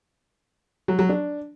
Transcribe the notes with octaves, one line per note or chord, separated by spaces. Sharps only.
F#3
F#3
D4